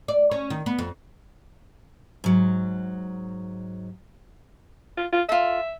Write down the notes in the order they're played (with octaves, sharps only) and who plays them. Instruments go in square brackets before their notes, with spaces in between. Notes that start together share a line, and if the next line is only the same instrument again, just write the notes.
[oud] D5
C#4
D#3
B3
F2
[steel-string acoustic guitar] G#2 F#3
[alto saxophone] F4
F4
[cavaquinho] F4 A4 [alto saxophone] E5